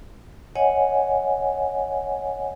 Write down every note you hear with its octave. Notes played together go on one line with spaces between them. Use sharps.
C#5 D#5 F#5 G#5